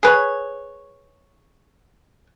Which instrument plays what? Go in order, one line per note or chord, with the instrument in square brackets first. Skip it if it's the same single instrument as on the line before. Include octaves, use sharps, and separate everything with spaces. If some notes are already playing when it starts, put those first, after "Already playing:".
[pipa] G#4 B4 C#5